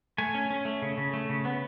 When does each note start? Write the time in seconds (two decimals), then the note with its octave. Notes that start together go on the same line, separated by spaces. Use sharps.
0.18 A3 G#5
0.35 C#4
0.50 C#4
0.65 A3
0.82 C#3
0.97 C#3
1.13 A3
1.29 C#3
1.45 B3